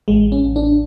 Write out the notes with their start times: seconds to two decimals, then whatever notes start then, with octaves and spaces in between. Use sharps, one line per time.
0.08 A1 G#3
0.32 C#4
0.44 A1
0.56 D4